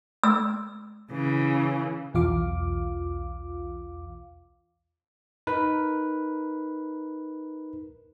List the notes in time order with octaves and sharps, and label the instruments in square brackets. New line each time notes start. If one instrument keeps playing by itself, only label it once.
[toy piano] E6
[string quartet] C#3 E3
[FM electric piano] B1 E2 F4 F5 D6
[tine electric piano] D#4 A#4 B4